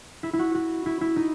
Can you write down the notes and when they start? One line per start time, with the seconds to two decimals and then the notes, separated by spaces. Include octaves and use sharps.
0.23 E4
0.33 E4
0.39 F#4
0.55 F#4
0.86 E4
1.01 E4
1.16 D#4